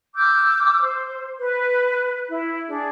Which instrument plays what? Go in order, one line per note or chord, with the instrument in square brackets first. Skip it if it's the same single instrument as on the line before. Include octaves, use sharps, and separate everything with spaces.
[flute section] D6 E6 F6 G6
C5
B4
E4
D4 G#4